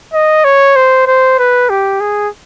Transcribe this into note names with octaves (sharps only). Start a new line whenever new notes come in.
D#5
C#5
C5
C5
B4
G4
G#4